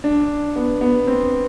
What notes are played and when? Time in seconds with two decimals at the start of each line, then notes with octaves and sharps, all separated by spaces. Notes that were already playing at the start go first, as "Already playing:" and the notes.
0.04 D4
0.56 B3
0.81 B3
1.07 C4